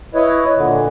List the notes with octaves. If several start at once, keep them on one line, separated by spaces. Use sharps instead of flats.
E4 B4 C#5 D#5
A#2 D3